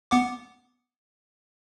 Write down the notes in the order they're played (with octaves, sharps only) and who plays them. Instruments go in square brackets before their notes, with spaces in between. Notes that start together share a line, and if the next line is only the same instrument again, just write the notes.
[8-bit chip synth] B3 F#5 D6